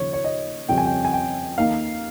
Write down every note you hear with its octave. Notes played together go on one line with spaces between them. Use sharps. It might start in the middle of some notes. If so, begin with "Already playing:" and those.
Already playing: D#2 C#3 F3 C#5
C#5
D#5
F2 C#3 G3 C#4 G5
G#5
G5
G#5
G5
D#2 D#3 A#3 D#4 F5